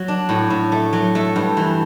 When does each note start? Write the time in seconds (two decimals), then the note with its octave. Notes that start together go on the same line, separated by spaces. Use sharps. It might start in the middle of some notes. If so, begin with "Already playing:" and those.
Already playing: F#3
0.08 D4
0.29 A2
0.50 A2
0.72 A3
0.93 F#3
1.15 A3
1.36 G2
1.57 E3